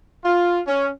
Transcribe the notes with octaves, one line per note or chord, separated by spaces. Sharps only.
F4
C#4